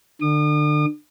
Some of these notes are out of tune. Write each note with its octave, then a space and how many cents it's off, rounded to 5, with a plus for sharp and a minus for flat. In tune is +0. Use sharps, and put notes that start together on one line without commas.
D3 +30 D#6 -40